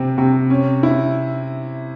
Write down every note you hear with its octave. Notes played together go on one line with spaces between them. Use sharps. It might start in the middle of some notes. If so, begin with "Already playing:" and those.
Already playing: C3 C4
C3
C#4
E4